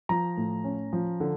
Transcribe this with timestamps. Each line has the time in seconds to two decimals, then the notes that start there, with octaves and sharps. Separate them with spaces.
0.09 F3 A#5
0.37 A2
0.64 C#4
0.93 F3
1.20 D3